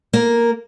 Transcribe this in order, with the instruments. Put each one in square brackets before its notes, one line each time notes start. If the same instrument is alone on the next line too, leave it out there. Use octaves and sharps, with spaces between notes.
[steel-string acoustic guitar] A#3 A#4